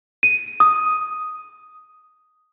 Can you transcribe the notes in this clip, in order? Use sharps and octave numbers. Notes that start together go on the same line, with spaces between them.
D#7
D#6